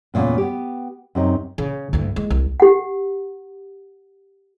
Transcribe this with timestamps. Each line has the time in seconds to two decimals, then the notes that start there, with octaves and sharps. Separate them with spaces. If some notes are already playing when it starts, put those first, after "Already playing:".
0.14 E2 A#2 C#3 B3 C#4
0.38 B3 G4
1.15 F#2 C3 D#4
1.58 C#3
1.93 D2 G2
2.16 G#3
2.30 C2
2.60 G4 F#5